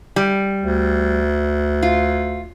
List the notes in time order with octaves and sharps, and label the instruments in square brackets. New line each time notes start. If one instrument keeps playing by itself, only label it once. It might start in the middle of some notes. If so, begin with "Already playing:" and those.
[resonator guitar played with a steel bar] G3
[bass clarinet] D2
[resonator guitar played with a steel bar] F4